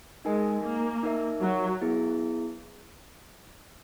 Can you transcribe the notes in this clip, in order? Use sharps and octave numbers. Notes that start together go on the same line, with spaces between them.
G#3 D#4 A#4 D#5 G#5
A#3
D#4 A#4 E5
F#3
B3 E4 G#4